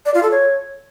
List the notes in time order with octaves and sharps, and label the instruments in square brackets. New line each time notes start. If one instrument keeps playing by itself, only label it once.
[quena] D5
F4
A4
C#5